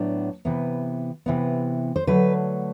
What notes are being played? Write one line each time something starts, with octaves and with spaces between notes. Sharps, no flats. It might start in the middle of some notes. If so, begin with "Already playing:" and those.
Already playing: A2 F#3 B3 D4
C3 E3 B3
C3 E3 B3
C5
D3 F#3 A3 B4